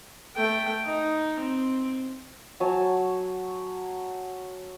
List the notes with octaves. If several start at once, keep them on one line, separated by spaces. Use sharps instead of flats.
A3 G5
D#4
C4
F#3 C#5 G#5 A5